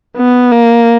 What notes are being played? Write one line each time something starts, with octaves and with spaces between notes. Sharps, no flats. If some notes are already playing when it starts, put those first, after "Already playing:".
B3
A#3